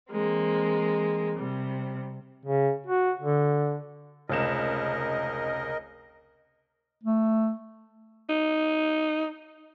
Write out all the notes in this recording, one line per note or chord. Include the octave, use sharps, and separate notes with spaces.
E3 G#3 A#3 C4
C3 G3
C#3
F#4
D3
F1 C#2 A#4 D#5 E7
A3
D#4